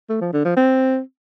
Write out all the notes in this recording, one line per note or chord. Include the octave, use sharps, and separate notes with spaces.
A3
F3
D3
F3
C4